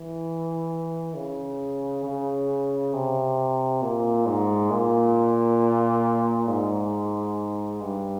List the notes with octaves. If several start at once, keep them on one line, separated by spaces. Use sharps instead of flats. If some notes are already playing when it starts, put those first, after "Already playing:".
Already playing: E3
C#3
C#3
C3
A#2
G#2
A#2
G#2
G2